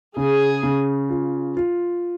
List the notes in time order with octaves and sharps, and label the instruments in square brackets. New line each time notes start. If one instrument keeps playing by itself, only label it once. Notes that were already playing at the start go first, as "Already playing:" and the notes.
[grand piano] C#3 [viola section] G#4
[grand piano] C#3
F4
F4